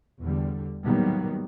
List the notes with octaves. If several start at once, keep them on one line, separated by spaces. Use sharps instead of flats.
E2 D3 G3
A2 D#3 F#3 G3 A#3 B3